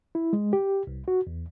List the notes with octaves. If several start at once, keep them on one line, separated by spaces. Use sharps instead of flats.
E4
G#3
G4
C2
F#4
E2